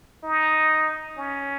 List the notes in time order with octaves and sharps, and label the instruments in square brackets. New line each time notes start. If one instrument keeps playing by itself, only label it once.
[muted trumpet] D#4
C#4